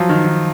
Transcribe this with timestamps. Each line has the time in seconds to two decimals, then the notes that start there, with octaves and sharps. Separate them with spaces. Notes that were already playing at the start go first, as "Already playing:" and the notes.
Already playing: F3 F#3
0.09 D#3
0.24 D#3